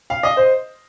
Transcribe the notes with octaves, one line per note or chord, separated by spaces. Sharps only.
F5
D#5
C5